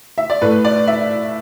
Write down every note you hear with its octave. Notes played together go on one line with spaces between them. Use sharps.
E5
D5
A2 A3 B4
D5
E5